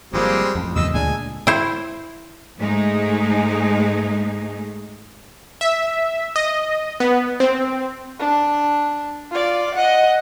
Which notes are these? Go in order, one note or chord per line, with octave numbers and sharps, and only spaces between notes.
G1 F3 G3 G#3 A#3 C4
A1 F2
E2 G2 C#3 D#5 E6
D2 A#2 G#3 D4 G#5
E4 C5
G#2 G#3 A3 D#4 G#4
E5
D#5
B3
C4
D4
F4 D5
D#5 F#5